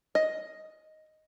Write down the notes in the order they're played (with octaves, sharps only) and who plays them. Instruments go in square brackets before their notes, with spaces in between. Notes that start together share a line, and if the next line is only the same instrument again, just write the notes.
[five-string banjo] D#5